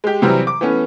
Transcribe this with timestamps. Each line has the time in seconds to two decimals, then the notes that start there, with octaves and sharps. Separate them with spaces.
0.04 G#3 G4
0.22 C3 E3 F#3 G3 C4
0.47 D6
0.61 E3 A3 B3 C#4